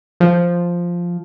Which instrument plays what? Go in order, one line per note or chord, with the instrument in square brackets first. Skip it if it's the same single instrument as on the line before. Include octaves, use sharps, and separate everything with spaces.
[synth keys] F3